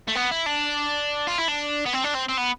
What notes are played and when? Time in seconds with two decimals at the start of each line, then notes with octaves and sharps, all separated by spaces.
0.08 A3
0.15 B3
0.31 E4
0.46 D4
1.28 F4
1.39 E4
1.49 D4
1.86 B3
1.94 C4
2.04 D4
2.15 C4
2.29 C4
2.38 B3